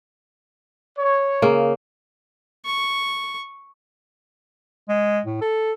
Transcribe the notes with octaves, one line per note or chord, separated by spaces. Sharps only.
C#5
C#3 A#3
C#6
G#3
A2
A4